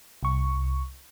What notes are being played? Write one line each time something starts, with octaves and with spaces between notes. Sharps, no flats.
C2 C#6